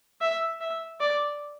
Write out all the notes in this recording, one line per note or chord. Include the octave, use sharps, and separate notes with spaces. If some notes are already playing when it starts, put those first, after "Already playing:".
E5
E5
D5